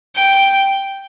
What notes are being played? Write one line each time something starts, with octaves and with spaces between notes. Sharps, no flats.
G5